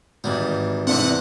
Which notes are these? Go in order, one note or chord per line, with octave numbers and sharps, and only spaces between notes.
G#1 E3 G3 D#4
E2 C3 C4 D4 E4 F4 D#5 F#5